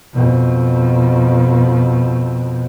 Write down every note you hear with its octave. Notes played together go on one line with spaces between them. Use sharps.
F2 B2